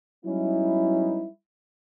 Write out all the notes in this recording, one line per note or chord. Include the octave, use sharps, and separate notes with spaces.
F#3 G3 B3 C#4 D#4 E4